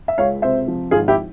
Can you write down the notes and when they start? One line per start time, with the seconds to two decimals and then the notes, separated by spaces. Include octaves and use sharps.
0.08 E5
0.18 C#2 C#5 F5
0.42 C3 C5 E5
0.68 F3
0.91 G#1 F4 G#4
1.08 E4 G4